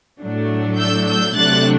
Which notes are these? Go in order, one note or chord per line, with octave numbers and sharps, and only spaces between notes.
A2 F#3 A3 D4
E6 G6
E6 G6
C3 F#3 A3 D4 F#6 A6